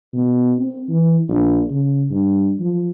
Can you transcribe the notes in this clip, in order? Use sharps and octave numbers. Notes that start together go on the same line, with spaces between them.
B2
C4
E3
A#1
C#3
G2
F3